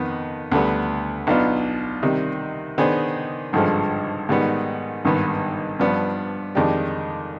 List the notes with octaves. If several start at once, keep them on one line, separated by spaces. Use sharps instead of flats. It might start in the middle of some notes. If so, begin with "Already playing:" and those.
Already playing: F2 D#3 B3
D2 D3 G3 B3
B1 B2 B3 D4 F4
C3 D#3 G3
D#3 B3 D4 G#4 C5
G#1 G2 D3 F3 G#3
G#2 D#3 G3 B3
G#1 G2 D#3 B3
G2 F3 B3 D4
F2 D#3 G#3 D4 G4